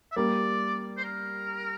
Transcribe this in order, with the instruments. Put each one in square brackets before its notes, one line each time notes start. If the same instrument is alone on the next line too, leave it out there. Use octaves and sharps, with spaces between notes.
[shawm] E5
[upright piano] G3 A#3 [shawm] D5
[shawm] C5
A#4